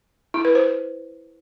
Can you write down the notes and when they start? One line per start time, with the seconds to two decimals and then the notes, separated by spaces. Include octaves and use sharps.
0.34 E4
0.45 B4
0.55 C5